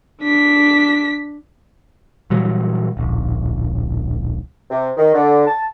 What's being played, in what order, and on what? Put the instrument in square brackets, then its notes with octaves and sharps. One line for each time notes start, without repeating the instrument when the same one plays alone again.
[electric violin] D4 B6
[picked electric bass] A#2 E3 F#3 G3
D1 A#1
[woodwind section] C3
D#3
D3
A5